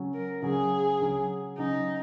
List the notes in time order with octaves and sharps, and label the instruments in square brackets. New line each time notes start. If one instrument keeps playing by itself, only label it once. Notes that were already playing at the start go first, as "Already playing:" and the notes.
Already playing: [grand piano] C#3 F#3 C#4
[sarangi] A#4
[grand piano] C#3 F#3 C#4 [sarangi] G#4
[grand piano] C#3 F#3 C#4
[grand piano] C#3 F#3 C#4 [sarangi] D#4